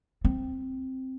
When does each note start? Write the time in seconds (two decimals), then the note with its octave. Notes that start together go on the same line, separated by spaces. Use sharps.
0.25 C4